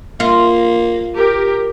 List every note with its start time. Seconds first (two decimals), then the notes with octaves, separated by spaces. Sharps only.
0.20 A#3 F4
1.14 G4 A#4